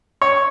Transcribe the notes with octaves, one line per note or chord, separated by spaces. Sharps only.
C#5